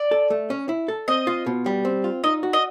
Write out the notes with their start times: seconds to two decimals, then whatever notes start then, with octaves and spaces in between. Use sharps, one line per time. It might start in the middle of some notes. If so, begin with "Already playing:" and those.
Already playing: D5
0.11 A4
0.30 A3
0.50 C#4
0.69 E4
0.88 A4
1.08 C4 D#5
1.27 F4
1.46 B2
1.66 G3
1.85 C4
2.04 F4
2.24 D#4 D#5
2.43 F#4
2.53 D#5